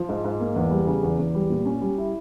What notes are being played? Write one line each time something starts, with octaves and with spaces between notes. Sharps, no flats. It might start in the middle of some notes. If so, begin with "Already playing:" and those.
Already playing: F3
G#2
G#2
A#3
E2
G3
C#3
E2
E2
G3
A#2
C#4
G3
E4